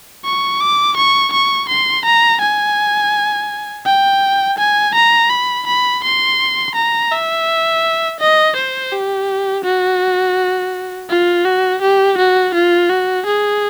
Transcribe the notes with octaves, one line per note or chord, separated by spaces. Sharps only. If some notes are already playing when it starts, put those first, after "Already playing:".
C#6
D6
C#6
C#6
C6
A#5
G#5
G5
G#5
A#5
B5
B5
C6
A#5
E5
D#5
C5
G4
F#4
F4
F#4
G4
F#4
F4
F#4
G#4